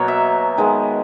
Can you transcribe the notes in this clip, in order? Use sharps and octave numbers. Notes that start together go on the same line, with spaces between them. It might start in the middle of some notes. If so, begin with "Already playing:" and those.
Already playing: B2 F#3 A#3 C#5
E5
D#3 G#3 B3